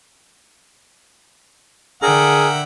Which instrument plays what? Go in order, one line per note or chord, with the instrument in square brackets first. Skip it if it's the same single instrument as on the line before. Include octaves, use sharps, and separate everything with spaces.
[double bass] D3 [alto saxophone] G#4 [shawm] A#4 [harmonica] E5 F#5 G5